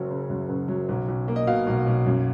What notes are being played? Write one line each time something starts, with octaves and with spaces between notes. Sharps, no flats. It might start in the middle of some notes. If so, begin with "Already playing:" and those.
Already playing: F#1 F#3
C#3
F#2
F#1
F#3
B1
B1
A#3
D#5
B2 F5
B1
B1
F#2